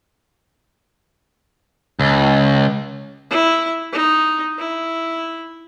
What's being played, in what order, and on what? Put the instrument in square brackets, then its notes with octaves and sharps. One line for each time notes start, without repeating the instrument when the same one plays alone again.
[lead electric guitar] C#2
[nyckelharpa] E4
D#4
E4